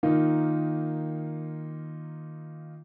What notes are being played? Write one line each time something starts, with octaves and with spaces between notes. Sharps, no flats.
D#3 A#3 D#4 F4